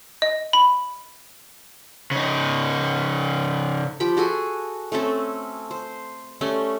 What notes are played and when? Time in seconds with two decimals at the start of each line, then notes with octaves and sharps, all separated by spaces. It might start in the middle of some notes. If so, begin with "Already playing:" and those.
0.22 D#5
0.53 B5
2.11 C#3 D#4
4.00 F3 G4 G5 B5
4.17 F#4 G#4 A4 G#5
4.92 A3 C4 C#4 A4
5.71 C5
6.41 G3 A3 C#4